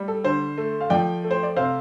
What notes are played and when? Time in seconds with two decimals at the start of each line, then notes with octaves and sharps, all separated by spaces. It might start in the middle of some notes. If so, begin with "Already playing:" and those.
Already playing: G3
0.08 A4
0.24 D3 C5
0.58 A3
0.81 F5
0.90 F3 D5 G5
1.24 A3
1.31 C5
1.43 D5
1.56 C3 C5 F5